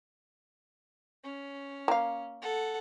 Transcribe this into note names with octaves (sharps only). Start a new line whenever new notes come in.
C#4
A#3 F5
A4 F#5